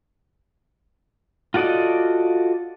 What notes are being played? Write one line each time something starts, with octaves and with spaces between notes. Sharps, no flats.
F4 F#4 A4 D5 D#5